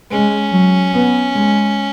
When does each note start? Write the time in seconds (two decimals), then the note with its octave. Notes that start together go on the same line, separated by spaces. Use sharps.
0.11 G#3 C#4
0.52 F#3
0.94 B3
1.35 G#3